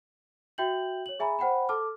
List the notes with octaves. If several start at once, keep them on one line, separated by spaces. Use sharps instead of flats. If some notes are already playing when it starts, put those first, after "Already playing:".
F#4 E5 G5 G6 F#7
C#5 F#7
G#4 E5 G#5 A#5 B5
C5 F#5 G5 B5
A4 A5 D6 F6